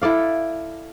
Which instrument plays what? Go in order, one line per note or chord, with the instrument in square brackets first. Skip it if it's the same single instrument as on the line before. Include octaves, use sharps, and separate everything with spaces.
[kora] E4 A4 D5 F5